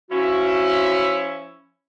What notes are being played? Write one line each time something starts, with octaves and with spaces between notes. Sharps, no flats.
F3 C#4 E4 F#4